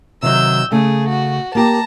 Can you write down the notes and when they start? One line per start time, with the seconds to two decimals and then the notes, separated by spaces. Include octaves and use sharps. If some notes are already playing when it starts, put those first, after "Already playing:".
0.23 C3 D#3 F#3 E6 G6
0.72 C#3 A3 G#4
1.09 F#4
1.55 A#3 G4 A5 A#5